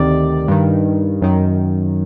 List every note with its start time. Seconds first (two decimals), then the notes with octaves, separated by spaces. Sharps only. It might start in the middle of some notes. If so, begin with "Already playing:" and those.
Already playing: D2 C3 D#3 D5
0.48 G2 D#3
1.22 F#2 D#3